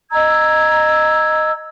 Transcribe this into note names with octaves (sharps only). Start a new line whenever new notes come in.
D#5 A#5 E6 G#6